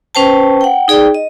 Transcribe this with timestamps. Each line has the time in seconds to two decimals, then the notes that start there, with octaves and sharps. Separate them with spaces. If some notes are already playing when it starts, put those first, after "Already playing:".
0.15 C#4 B4 C5 G5 A5
0.61 F#5 G5
0.88 D#4 G#4 D5 G5
1.15 D#5